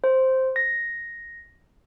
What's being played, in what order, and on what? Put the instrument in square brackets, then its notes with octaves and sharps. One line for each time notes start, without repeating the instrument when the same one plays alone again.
[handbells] C5
A#6